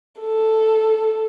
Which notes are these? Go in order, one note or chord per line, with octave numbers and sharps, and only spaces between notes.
A4